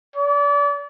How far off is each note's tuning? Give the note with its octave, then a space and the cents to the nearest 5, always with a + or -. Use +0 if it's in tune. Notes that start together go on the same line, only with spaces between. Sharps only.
D5 -35